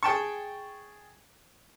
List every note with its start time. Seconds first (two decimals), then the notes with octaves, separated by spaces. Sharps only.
0.03 G#4 G5 A5 C#6